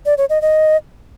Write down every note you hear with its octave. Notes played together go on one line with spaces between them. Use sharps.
D5
C#5
D#5
D#5